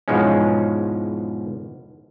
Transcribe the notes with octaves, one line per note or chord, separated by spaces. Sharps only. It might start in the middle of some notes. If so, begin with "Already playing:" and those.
E2 G#2 B2 F3 G#3 C#4